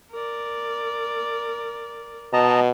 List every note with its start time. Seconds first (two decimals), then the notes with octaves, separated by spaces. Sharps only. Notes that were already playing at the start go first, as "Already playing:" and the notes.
0.12 A#4 D5
2.33 B2 D#5 A5 A#5